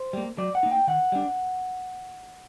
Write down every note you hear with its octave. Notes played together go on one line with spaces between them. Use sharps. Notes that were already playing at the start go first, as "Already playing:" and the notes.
Already playing: C5
G3 A#3
F#3 D5
F#5
A#3 D#4
G5
D#3 F#5
G3 D4